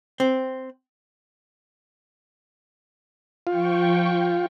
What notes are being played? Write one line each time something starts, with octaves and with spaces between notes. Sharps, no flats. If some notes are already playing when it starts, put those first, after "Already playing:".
C4
F3 F4 G5 C#6